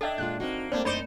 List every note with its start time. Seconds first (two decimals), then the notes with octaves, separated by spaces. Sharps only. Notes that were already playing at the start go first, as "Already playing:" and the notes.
0.01 D4 A4 D#5 E5 G5 G#6
0.18 A#2 G#3 F4 F#6
0.40 A#3 C4 D#4 F#4
0.72 G3 A3 A#3 C4 D4 C5 D5
0.85 F#2 D#4 C5 D5 B5 G6 C#7 E7